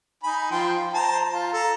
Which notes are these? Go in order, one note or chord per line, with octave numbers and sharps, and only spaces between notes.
D#4 G#5 B5
F3 G5 C6
C5 A5 A#5
F4
A4 A#5